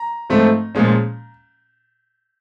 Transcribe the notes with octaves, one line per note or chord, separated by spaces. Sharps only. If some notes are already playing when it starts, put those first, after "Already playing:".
Already playing: A#5
G#2 F3 A3 C4
A#2 F3 G#3 C#4